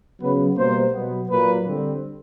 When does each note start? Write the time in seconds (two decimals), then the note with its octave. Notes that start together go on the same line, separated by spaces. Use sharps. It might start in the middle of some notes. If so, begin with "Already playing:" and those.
0.20 C#3 F#3 B3 B4
0.55 B2 G3 A#3 C5
0.92 B2 F#3 B3
1.29 A#2 F#3 A#3 B4
1.64 D3 G3 C4